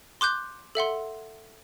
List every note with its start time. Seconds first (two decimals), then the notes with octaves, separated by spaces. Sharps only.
0.21 C6 D6 F#6 G6
0.75 A4 E5 F#5 C6